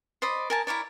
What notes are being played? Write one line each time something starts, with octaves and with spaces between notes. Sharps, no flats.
C5 D5 D#5 B5
A#4 G#5 A5
E4 A#4 C#5 D5